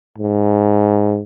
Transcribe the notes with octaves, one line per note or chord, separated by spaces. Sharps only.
G#2